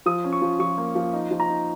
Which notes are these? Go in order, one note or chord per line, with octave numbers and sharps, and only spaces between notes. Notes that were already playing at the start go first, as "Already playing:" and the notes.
F3 D#6
C#4
C#6
F3
F3 C#6
A#3
F3
D#4
F3
A#5
D#4